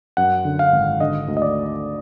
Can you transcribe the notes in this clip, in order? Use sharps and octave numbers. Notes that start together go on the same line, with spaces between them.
F#2 F#5
D3
F5
G#1
D3 D#5
D2
D#5
D5